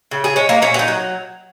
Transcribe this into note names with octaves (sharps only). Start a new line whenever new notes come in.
C#3
G#4
G#3 C#4
A#3
A#2 C#4
F#4
D#4
F#3